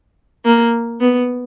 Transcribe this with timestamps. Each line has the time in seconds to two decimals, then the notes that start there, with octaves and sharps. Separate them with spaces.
0.45 A#3
1.00 B3